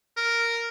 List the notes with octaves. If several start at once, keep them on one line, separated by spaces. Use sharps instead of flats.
A#4